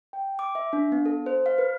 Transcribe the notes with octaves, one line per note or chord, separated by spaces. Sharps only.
G5
D6
E5
D4
B3
A4
C5
F5
B4